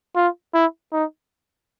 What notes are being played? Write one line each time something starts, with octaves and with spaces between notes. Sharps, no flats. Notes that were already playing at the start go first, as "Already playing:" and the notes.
F4
E4
D#4